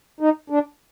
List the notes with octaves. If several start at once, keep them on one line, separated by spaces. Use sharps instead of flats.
D#4
D4